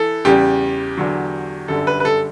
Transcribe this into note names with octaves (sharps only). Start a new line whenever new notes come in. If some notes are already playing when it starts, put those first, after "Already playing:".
Already playing: E3 A4
E2 C#3 G3 G4
E2 D3 F#3
G1 F#2 D3 G3 A4
B4
B4
A4